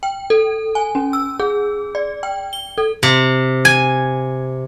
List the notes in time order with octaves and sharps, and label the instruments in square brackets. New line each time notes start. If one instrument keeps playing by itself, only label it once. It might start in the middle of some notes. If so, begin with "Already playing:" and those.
[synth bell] G5
A4
G#5
C#4
E6
G#4
D5
G5
G7
A4
[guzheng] C3
G#5